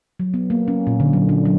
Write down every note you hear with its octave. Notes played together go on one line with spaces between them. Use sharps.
F#3
B3
A#3
C#4
A#2
D3
F#3
D4
F#3